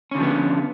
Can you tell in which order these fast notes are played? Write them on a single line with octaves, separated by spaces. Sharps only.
C#4 D3 F3 B3